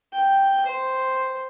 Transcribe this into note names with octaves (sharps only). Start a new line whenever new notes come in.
G5
C5